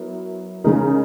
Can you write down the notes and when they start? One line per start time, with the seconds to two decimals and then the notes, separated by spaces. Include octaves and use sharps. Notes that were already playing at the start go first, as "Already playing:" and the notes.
Already playing: F#3 B3 E4 A#4
0.64 C#3 G#3 D#4 A#4